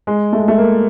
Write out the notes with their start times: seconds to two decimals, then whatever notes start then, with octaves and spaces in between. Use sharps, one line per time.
0.07 G#3
0.33 A3
0.39 G#3
0.48 A3
0.58 A#3